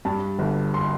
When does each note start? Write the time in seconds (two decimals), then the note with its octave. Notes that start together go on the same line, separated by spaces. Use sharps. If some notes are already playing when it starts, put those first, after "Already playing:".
0.05 G2 A5
0.39 G1
0.74 C6